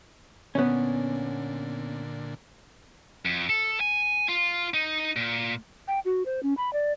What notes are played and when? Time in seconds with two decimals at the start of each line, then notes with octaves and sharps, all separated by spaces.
0.55 A#2 D3 B3 C#4
3.25 F2
3.49 A4
3.80 G#5
4.29 F4
4.74 D#4
5.16 A#2
5.88 G5
6.05 F#4
6.26 C5
6.43 C#4
6.57 B5
6.73 D5